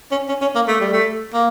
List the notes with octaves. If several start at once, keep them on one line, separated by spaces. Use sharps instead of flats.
C#4
C#4
C#4
A#3
A3
G3
A3
A#3